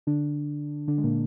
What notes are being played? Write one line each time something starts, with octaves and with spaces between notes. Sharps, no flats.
D3 D4
D3 D4
G#3
A#2 A#3